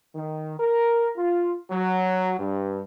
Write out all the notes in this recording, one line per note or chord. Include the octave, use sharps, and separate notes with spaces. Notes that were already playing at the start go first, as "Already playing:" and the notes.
D#3
A#4
F4
F#3
G2